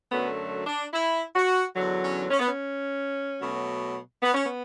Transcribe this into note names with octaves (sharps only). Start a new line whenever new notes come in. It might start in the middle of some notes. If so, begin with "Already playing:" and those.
F#2 D3 F#3 A3 B3
D4
E4
F#4
E2 D3 F#3
C#4
C#4
B3
C#4
B2 F#3 A3
B3
C#4
B3